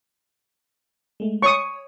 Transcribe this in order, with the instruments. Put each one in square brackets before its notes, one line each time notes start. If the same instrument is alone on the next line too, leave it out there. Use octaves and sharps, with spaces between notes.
[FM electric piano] G#3 A3
[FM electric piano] C#5 [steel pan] C#6 D#6